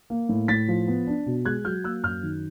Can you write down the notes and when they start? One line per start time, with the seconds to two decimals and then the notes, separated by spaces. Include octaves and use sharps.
0.10 A#3
0.29 A2
0.48 A2 A6 B6
0.68 F3
0.88 B3
1.07 D4
1.26 B2
1.45 G#3 F#6 G#6
1.65 F#3 F6 G6
1.84 A#3 E6 F#6
2.03 F#2 F6 G6
2.23 D#3